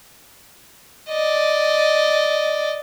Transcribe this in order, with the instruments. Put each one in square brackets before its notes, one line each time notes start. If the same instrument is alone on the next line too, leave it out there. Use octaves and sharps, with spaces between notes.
[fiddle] D5 D#5